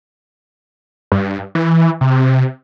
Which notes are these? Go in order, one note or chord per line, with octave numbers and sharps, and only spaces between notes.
G2
E3
C3